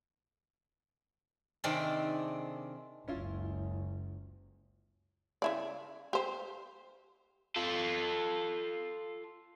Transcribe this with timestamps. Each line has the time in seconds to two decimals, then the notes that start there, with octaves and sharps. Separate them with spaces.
1.64 C3 D#3 C4 D4 G#4 A4
3.08 F#1 C#2 C#4 E4 F4
5.42 C#3 E4 D5
6.13 G4 C5
7.56 F4 A4